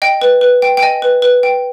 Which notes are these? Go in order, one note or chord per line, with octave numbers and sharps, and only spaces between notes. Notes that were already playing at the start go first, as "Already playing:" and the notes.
D#5 G5
B4
B4
G5
G5
D#5 G#5
B4
B4
G5